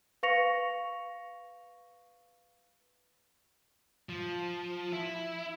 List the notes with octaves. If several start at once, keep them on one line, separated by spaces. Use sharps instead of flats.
B4 F5 C#6 A#6 C#7 F7
F3
E4